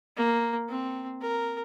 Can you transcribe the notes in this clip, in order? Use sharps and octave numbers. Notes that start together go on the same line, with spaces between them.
A#3
C4
A#4